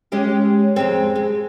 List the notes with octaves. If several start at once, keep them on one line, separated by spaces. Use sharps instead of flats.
G#3 C#4 G4
F2 G#3 C4
G#3